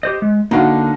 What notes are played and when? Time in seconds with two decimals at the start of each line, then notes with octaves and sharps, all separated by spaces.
0.03 G4 C5 D#5
0.22 G#3
0.51 D3 A#3 D4 D#4 F#4 F5